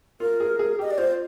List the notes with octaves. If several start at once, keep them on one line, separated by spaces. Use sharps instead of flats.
F4 A#4
G#4
G#4
G4 D#5
D5
F4 C5